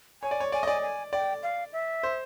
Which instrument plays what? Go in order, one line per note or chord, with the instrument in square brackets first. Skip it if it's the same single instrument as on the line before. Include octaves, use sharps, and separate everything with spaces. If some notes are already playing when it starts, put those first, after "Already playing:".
[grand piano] C#5 [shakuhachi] G#5
[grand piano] D5
C#5
[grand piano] D5 [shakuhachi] G#5
[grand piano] D#5
[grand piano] D5 [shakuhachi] G#5
[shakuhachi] G#5
[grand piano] D5 [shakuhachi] G5
[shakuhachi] F5
E5
[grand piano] C5